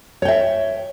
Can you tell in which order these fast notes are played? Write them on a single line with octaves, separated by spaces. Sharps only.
C#5 G5 E5